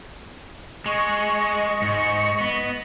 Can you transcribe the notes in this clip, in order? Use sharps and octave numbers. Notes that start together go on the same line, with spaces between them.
G#3 D#5 C#6
G#2
B3